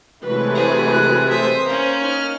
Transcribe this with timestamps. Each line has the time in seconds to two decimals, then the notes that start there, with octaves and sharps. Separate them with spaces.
0.24 C3 E3 F#3 G#3 A3 B4
0.55 G#4 C5
0.92 F#6
1.29 C5 E5 D#6
1.65 A#3 C#4
2.01 D#4 F6